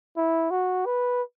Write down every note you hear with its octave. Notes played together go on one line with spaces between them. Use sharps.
E4
F#4
B4